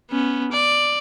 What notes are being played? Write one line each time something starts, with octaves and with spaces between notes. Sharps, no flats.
B3 C#4
D5